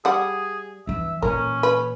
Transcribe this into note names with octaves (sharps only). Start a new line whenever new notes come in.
G3 G#4 F#5
G2 E3 E5
A#2 E3 C#4 A#4
B4